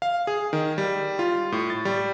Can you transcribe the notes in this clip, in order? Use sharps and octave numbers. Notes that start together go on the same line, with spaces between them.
F5
G#4
D#3
G3
F4
A2
A6
G3